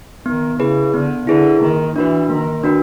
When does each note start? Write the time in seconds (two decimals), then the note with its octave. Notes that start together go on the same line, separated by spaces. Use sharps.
0.26 D#3 B3
0.59 C#3 E4 G#4 B4
0.94 D3 B3
1.27 D3 E4 G#4 B4
1.62 D#3 A#3
1.96 E3 D4 F#4 B4
2.30 D#3 A#3
2.63 D4 F#4 B4